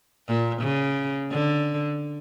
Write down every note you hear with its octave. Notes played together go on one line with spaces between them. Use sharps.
A#2
C#3
D3